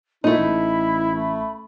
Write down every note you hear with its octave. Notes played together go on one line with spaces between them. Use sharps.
A#2 A3 D#4 E4 B5
A1
A3